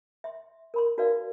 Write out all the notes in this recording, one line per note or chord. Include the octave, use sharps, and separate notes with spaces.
E5 C6
A#4 B5 C6
D#4 F#4 A#4 B4 D5 F5